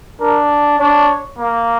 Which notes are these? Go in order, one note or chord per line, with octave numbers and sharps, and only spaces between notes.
D4 A#4
D4 C#5
A#3